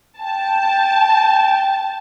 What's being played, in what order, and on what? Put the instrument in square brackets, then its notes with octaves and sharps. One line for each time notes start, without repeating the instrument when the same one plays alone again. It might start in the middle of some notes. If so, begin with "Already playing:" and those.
[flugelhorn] G5 [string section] A5